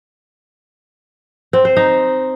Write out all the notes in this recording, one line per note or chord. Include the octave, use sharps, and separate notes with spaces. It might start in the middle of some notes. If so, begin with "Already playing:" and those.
C4
C5
D#4